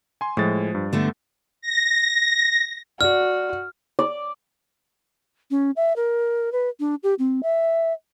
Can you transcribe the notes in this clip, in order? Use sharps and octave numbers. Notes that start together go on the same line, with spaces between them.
G#5 C6
A2 F3 G#3 A6
G2
D3 A3 B3
A#6
F#4 D5 F6
D5
C#4
E5
A#4
B4
D4
G4
C4
E5